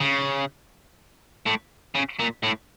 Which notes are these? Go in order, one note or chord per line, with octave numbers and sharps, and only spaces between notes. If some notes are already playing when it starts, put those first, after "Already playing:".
C#3
A2
C#3
A#2
A2